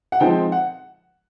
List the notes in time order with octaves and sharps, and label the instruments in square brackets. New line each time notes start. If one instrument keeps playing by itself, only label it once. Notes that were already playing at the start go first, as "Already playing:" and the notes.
[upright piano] F#5
F3 G#3 C4 D#4 G5
F#5